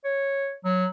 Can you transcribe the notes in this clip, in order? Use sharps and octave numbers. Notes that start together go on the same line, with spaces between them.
C#5
F#3